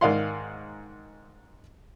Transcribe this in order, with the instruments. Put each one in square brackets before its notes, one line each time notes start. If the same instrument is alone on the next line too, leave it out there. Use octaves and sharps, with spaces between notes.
[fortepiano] G#2 D#3 D5 F5 F#5 C6